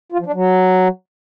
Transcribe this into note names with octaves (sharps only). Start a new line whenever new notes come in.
F4
F3
D4
F#3